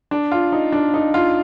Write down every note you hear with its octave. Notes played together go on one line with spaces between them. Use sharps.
D4
F4
D#4
D4
D#4
F4